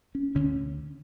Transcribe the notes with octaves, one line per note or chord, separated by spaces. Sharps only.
C#4
D2 D3 C#4